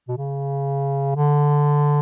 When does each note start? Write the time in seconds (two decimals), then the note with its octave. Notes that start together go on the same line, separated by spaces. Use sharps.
0.09 B2
0.17 C#3
1.16 D3